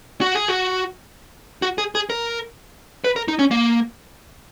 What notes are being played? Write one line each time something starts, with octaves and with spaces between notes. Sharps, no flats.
F#4
G#4
F#4
F#4
G#4
G#4
A#4
B4
A#4
D#4
C#4
A#3